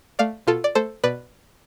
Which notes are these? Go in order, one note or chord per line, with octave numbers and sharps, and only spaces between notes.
A3 D5 F5
B2 F4 A4
D5
A3 A4 C5
B2 B4 D5